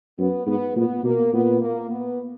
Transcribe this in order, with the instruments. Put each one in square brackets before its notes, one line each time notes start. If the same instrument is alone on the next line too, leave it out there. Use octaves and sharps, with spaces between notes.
[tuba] F#2 [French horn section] B3
[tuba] G#2 [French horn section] B3
[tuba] A#2 [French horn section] B3
[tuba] B2 [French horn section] A#3
[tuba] A#2 [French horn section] B3
[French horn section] A#3
B3